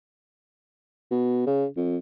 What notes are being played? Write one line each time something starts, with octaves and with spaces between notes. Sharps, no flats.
B2
C#3
F2